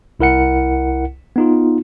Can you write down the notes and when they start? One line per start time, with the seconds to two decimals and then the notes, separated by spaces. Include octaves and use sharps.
0.19 C2 E4 A#4 F#5 C#7
1.36 B3 D#4 F4